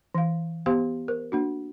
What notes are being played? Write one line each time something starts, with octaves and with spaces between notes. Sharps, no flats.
E3 F5
B3 G4 C5 F5 C6
A#4 C5
A#3 D4 F#4